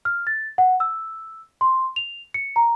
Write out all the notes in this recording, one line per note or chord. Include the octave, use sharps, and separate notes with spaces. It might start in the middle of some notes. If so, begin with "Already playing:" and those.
F6
A6
F#5
E6
C6
F7
C#7
A#5